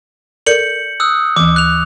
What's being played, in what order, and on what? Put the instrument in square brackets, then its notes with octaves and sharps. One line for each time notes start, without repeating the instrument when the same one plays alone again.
[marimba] A4 A#4 D5 [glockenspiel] G6 C#7 F#7
[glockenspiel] D#6 E6 F#6
[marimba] D2 E3 [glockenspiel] D6
[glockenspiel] F#6 F7